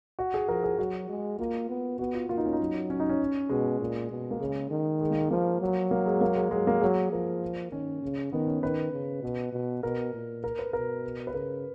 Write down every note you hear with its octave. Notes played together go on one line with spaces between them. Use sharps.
F#4
G#4
F3 A#4
G#4
F#3 F#4
G#3
A#3 F4
B3
B3 F#4
F4
A#3 F4
D#4
C#4
D#4
F#3
C#4
D#4
C#4
B2 G#3
A#2
B2
A#3
C#3 G#3
D#3
G#3
A#3
G#3
F3 A#3
F#3
A#3
G#3
A#3
G#3
F#3 G#3
A#3
F#3 G#4
F3 A#4
D#3 C#4
C#3
D#3 B3
C#4
D#3 B4
C#3
B2
B2
B2 A#4
A#2
A#4
B4
B2 A#4
B4
C#3 A#4